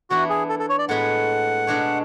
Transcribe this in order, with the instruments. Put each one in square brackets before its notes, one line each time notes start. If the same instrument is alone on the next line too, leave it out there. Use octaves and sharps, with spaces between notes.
[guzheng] E3 B3 D4 [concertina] F#4
[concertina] G#4
A4
A4
C#5
D5
[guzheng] A2 G#3 B3 F#4 [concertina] F#5
[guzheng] B2 G#3 D4 F#4 C#5